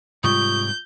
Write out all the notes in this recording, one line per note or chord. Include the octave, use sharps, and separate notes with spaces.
G#2 C3 G3 F4 C#6 D#6 G6